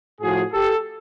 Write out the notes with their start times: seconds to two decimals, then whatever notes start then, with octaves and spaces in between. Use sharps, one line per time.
0.21 A2 F3 F#4 G#4
0.52 G4 A4